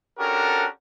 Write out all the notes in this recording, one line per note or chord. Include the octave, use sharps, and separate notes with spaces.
C#4 D4 F#4 G4 A4 A#4